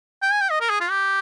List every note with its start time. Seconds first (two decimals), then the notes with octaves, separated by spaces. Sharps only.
0.22 G5
0.32 G#5
0.41 G5
0.51 D#5
0.60 A#4
0.70 G#4
0.81 F4
0.90 G4